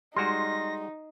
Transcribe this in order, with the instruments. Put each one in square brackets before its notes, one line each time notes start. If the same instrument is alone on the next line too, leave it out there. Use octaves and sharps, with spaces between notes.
[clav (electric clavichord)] G3 G#3 F#4 [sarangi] D#4 [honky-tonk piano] C6 [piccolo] A#6